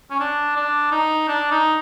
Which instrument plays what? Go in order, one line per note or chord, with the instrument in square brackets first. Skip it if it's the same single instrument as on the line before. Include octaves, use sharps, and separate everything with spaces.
[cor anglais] C#4
D4
D4
D#4
D4
D#4